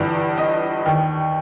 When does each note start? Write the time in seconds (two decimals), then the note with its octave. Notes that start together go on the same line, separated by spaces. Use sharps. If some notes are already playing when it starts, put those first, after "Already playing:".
Already playing: G1 G2 E3
0.38 D#5
0.85 D#2 D#3